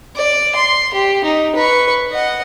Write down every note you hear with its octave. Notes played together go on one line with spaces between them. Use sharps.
D5
C6
G4
D#4
B4 C#6
D#5 F#5